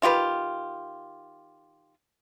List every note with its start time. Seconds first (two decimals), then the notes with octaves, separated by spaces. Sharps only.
0.02 D#3 F4 G4 B4